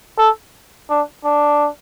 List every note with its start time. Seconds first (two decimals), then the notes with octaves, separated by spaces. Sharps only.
0.18 A4
0.90 D4
1.25 D4